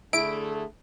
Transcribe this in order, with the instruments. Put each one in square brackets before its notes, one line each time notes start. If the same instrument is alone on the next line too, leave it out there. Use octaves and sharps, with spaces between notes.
[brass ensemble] D3 A3 [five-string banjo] E4 [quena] G#4 [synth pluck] D7